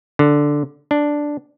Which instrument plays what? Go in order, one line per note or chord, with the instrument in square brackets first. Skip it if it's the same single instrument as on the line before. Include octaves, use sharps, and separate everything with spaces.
[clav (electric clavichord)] D3
D4